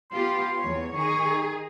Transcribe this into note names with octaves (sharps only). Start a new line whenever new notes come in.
B3 F4 G4 C6
E2 C#5
D#3 D#4 G#4 C#6